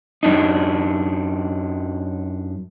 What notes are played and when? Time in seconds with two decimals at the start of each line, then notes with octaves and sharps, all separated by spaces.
0.23 F#2 D4 D#4